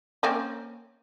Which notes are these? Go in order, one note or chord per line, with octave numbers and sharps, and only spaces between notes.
A#3 C4 C#4